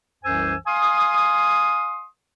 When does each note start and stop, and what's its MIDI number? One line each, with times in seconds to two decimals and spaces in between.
0.24 0.55 36
0.24 0.55 42
0.24 0.55 52
0.24 0.55 72
0.24 0.55 80
0.24 0.55 88
0.66 2.04 77
0.66 2.04 80
0.66 2.04 84
0.66 2.04 87